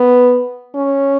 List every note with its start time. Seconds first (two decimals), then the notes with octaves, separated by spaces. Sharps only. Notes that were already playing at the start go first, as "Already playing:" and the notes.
Already playing: B3
0.75 C#4